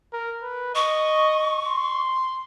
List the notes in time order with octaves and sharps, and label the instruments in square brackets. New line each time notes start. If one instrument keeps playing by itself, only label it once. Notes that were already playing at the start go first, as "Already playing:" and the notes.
[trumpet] A#4
B4
[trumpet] D#5 [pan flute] C#6
[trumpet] C6